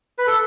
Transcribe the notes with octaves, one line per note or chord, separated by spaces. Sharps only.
B4
A4